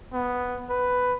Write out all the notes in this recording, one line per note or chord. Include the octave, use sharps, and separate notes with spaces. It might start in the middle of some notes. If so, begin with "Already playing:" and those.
B3
B4